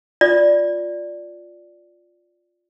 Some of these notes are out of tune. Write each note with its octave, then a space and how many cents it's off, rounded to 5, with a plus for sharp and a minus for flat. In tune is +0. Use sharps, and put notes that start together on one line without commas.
F4 +10 D5 +0